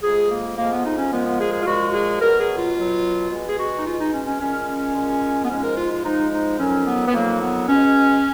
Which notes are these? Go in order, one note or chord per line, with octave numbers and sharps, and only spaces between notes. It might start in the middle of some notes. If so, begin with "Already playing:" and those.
F2 F3 G#3 G#4
A#3
F2 F3 G#3 A#3
B3
D#4
C#4
A#2 F3 G#3 B3
B3
G#4
G#4
F4
A#2 F3 G#3 F#4
F#4
G#4
B2 F#3 A#4
G#4
F4
B2 F#3
B2 G#3
G#4
F#4
D#4
B2 G#3 F4
D#4
C#4
C#4
A#2 G#3 C#4
A#2 G#3
B3
G#2 F3 G#3 C#4
A#4
F4
F4
G#2 F3 G#3 D#4
D#4
F2 D#3 F#3 C#4
B3
B3
F2 D#3 F#3 A#3
B3
B2 G#3 C#4